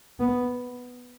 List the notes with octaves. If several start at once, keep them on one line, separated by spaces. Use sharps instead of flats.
B3